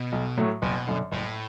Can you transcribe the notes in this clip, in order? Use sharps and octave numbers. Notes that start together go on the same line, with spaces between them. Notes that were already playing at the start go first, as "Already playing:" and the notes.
Already playing: B2
B1
A2 F#3 A3
F#1 B2
F#2 D3
F#1 A2